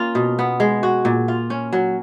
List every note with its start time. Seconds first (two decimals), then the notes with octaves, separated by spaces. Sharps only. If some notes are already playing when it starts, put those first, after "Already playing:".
Already playing: A#3 C#4 F4
0.15 B2
0.39 B3
0.60 G#3
0.83 F#4
1.05 A#2
1.28 F4
1.50 C#4
1.73 F#3